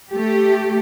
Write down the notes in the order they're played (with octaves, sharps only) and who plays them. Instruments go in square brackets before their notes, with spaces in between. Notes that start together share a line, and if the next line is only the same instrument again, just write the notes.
[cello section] A3 G4